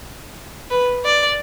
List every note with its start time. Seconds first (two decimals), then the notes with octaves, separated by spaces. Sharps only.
0.70 B4
1.04 D5